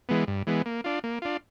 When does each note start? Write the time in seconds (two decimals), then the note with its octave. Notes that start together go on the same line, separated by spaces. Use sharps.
0.09 E3 G#3 B3
0.27 G2
0.47 E3 G#3 B3
0.66 A#3
0.84 D4 F4
1.04 A#3
1.22 D4 F4